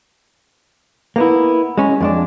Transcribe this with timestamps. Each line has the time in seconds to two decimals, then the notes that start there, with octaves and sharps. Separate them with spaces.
1.16 A#3 B3 E4
1.78 G#3 C#4
2.01 F2 G#3 D4